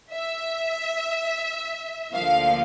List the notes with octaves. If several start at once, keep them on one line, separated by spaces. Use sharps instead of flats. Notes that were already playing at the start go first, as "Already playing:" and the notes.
E5
D2 D3 F3 A#3 F5